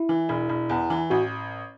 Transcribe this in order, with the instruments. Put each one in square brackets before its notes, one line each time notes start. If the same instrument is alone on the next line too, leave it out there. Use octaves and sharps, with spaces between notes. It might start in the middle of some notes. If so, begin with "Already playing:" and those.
Already playing: [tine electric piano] E4
[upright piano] E3
E1
E1
E2
E3
[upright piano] A1 [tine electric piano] F#4